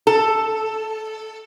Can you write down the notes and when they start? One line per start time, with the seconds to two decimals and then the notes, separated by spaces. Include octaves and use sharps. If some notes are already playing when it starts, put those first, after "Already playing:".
0.07 A4